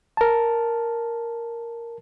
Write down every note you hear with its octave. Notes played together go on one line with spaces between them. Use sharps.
A#4 A5